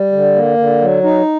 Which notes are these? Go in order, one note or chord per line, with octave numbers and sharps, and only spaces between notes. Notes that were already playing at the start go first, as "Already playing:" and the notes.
Already playing: G3
D3
A#3
D3
F#3
D#4